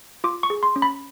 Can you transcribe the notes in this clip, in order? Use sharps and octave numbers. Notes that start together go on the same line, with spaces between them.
F4 D6
C#6
G#4
C6
C#4
B5